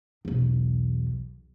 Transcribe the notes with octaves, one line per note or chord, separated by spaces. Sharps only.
B1 E2